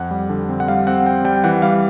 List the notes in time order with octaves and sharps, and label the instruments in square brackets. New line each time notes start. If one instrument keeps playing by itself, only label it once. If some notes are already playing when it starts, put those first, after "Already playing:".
Already playing: [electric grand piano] F2 F#5
G3
D3
C4
F#5
G3 F5
C4 F#5
C4 G5
G3 G5
E3 F#5
G3 F5